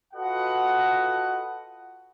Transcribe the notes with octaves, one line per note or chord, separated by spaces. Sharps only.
F4 F#4 A4 B4 D#5 F#5